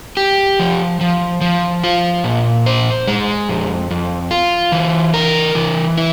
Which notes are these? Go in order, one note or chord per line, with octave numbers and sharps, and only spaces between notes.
G4
F3
F3
F3
F4
A#2
C5
G#3
F2
F2
F4
E3
A#4
E3
E4